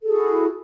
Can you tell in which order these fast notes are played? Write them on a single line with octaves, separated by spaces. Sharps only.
A4 G#4 F#4 E4